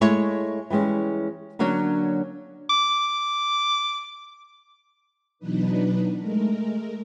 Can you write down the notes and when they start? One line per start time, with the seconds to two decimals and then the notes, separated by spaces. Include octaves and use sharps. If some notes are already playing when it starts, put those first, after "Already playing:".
0.01 G#3 A3 E4 C#5
0.70 E3 G3 G#3 C#4
1.59 D3 F#3 A#3 C#4 D4
2.70 D6
5.39 B2 E3 F#3 D4 D#4 B4
6.19 G#3 A3 A#4